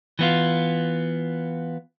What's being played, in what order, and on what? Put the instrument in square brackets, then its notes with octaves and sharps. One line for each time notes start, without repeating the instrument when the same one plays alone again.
[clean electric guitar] E3 B3 F4